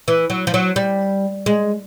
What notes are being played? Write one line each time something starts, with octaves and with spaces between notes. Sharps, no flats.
E3
F#3
F3
F#3
G3
G#3